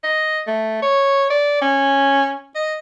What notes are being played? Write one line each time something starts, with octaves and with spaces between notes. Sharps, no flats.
D#5
A3
C#5
D5
C#4
D#5